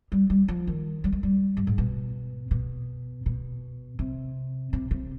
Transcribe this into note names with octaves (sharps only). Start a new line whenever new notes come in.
G3
G3
F3
D#3
G3
G#3
G3
G2
G#2
B2
B2
B2
C3
C3
C3